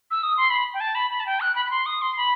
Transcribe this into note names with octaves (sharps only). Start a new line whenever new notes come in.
E6
D#6
C6
B5
G5
A5
B5
B5
A5
G5
F#6
B5
B5
C6
D#6
C6
B5